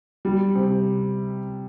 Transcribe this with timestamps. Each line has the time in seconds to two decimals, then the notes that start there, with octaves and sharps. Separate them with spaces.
0.25 G3
0.55 C3